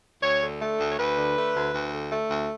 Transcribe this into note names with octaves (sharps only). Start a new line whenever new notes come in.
D2 C#5
D3
A3
D2
C#5
D2 B4
D3
A3
D2
D2
D3
A3
D2